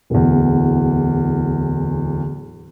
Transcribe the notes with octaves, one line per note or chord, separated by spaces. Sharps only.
D1 E2